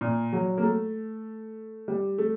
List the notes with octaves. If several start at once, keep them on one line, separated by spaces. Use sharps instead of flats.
A#2
F#3
A#3
A3
G3
A3